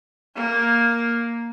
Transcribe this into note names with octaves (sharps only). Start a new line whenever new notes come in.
A#3